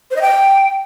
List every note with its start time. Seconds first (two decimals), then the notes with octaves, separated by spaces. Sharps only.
0.11 C5
0.16 D#5
0.21 G5